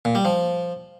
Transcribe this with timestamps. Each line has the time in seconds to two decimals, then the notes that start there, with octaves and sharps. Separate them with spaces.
0.05 A#2
0.15 G3
0.25 F3